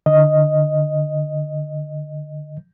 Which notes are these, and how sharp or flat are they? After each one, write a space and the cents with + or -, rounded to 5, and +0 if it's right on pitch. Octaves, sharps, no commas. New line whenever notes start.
D3 +15 D#5 +0